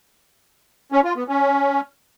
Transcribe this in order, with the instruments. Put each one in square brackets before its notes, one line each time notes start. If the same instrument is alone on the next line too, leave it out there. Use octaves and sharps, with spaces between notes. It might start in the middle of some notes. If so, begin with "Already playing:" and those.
[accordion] C#4
F4
B3
C#4